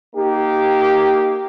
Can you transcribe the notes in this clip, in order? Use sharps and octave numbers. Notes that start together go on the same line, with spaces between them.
A#3 D#4 G4